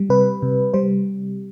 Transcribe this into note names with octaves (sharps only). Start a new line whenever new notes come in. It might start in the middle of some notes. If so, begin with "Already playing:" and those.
Already playing: G3
C3 B4
C3
G3 C5